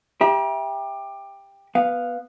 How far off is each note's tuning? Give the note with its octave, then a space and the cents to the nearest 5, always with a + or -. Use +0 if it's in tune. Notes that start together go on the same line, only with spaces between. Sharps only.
G4 +15 E5 +0 A#5 +45
B3 +0 F5 +0